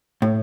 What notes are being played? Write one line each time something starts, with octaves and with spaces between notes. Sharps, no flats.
A2